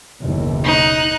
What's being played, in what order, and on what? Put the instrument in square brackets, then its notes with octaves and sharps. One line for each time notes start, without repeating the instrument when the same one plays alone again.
[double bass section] F#1 D#2 B2
[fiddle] D#4 F#6